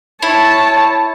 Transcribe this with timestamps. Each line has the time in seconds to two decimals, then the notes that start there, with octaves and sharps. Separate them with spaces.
0.22 E4 C#5 A5